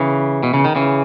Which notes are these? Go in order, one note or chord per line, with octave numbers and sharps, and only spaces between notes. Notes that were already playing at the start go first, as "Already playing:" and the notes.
Already playing: C#3 E3
B2
C#3
D#3
C#3 E3